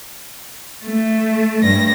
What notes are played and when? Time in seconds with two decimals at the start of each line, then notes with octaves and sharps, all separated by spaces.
0.85 A3
1.61 G2 A#6